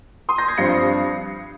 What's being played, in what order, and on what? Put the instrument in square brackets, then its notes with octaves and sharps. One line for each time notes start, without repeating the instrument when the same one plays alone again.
[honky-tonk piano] C6 D#6
G6 A#6
G#6 C7
G2 F3 C4 A#6 C#7